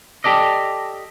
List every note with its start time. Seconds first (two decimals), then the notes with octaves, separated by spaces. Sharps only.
0.24 G4 A4 D5 D#5